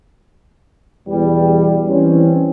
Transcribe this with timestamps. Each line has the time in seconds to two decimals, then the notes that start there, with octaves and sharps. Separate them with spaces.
1.07 E2 B2 G3
1.87 E3 C4 C#4